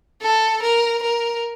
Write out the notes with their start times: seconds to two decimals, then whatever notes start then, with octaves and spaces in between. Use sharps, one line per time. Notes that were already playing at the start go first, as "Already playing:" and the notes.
0.21 A4
0.62 A#4
1.02 A#4